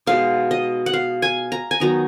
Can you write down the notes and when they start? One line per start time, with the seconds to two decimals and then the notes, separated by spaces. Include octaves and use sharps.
0.06 B2 G#3 B3 D#4 F5
0.51 D#5
0.86 F#5
0.94 F5
1.22 G#5
1.52 A#5
1.71 G#5
1.80 D#3 F#3 B3 D#4 A#5